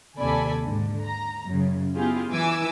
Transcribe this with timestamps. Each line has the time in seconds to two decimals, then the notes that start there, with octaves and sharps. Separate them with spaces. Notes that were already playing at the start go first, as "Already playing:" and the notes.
0.18 D#2 C3 A4 D5 G#5 B5
0.64 G#2 D3
1.04 A#5
1.47 F#2 C#3
1.96 B3 E4 F4 G4 G#4
2.32 E3 G#5 D6 E6